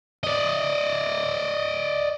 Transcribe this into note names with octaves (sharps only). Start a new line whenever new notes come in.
D5 D#5